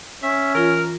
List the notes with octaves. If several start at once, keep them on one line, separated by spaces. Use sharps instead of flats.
C#4 E5
E3 F4 A#4